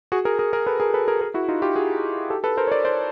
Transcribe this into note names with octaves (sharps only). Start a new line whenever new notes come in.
F#4 G#4
G#4 A#4
G#4 A#4
G#4 A#4
A4 B4
G#4 A#4
A4 B4
G#4 A#4
G#4 A#4
E4 F#4
D#4 F4
F4 G4
F#4 G#4
G4 A4
A4 B4
A#4 C5
C#5
C5 D5
C5 D5